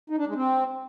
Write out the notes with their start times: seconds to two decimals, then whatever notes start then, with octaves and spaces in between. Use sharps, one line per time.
0.10 D#4
0.18 D4
0.27 G#3
0.36 C4